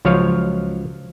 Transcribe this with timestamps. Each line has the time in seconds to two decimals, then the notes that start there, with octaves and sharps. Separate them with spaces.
0.05 C#2 F3 F#3 C#5 F5